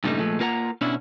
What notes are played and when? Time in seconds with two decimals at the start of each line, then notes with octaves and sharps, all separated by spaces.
0.04 G2 A#2 C#3 G3 A3 D#4
0.19 A#2 F3 G#3 A3
0.40 A#3 F4 A#4 F#5 G5 A#5
0.81 B2 C#4 D4 E4